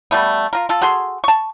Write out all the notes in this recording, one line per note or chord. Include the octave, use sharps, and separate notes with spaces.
G3 A3 B3
F4 A#4
F4 A4
F#4 G#4 A4 C6
A5 C#6